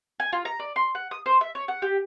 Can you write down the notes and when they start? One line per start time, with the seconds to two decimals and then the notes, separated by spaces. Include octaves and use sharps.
0.20 G#5
0.33 F4
0.45 A#5
0.60 D5
0.76 C6
0.95 F#5
1.11 D#6
1.26 C5
1.41 E5
1.55 C#5
1.68 F#5
1.82 G4